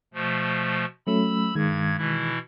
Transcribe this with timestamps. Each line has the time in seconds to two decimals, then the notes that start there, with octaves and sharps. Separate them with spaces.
0.14 B2 F3 A3
1.07 F#3 A3 C#4 B5 E6
1.55 G2 D#3 G#3 G#6
1.98 B2 E3 E4